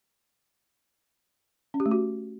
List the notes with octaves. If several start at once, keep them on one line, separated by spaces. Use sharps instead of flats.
C#4
G4
A3
F#4